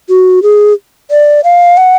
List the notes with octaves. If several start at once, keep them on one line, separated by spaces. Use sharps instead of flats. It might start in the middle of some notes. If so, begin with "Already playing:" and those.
F#4
G#4
D5
F5
F#5